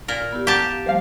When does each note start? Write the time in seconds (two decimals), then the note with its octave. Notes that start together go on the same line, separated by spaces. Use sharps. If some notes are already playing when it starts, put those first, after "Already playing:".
0.08 A#2 A#4
0.32 B3 E4 G4
0.47 G4 F#5 A5 A#5
0.65 F5
0.86 F3 G3 A3 C5 F5